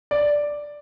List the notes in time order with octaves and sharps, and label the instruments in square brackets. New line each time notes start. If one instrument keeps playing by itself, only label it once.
[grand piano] D5